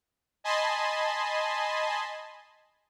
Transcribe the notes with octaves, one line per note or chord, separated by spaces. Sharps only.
D#5 G#5 A5 B5 C6